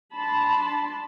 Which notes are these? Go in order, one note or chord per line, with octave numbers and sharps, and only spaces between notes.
D4 A5 B5 C6